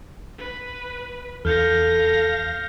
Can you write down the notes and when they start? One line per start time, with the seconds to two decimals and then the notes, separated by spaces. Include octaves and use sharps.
0.38 B4
1.45 E2 A4 F5 F6 G6 A#6 C#7